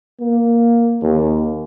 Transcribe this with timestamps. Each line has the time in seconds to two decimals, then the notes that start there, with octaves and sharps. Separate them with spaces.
0.20 A#3
1.02 D#2